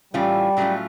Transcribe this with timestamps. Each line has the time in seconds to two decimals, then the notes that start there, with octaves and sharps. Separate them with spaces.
0.13 A2 E3 G3 A3 C#4 F4
0.57 A2 F#3 A3 C#4 F4